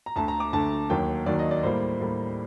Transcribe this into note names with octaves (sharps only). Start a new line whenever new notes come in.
A#5
D2 D3 A3 A5
A#5
D6
D2 D3 A3 A5
D#2 D#3 F#3 A#3 G5
D#2 D#3 F#3 A#3 D5
D#5
D5
A2 G3 A#3 C5
A2 G3 A#3